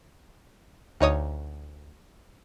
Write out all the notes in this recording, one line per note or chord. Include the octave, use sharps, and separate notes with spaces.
D2 D#4 C#5 D#6